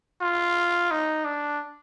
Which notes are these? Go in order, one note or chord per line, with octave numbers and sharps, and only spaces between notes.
F4
D#4
D4